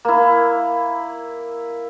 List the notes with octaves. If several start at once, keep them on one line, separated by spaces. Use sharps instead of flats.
A#3 E4